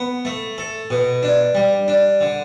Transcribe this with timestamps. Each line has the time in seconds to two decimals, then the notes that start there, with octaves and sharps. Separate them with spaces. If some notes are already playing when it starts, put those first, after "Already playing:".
Already playing: B3
0.25 A3
0.58 A4
0.90 B2
1.23 D4
1.55 G3
1.88 D4
2.21 D3